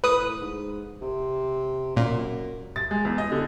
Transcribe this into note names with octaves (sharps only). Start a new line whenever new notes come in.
A2 B4 D#6
G#2
C3
F#2 A#2
A6
G#3
E2
D#5
D3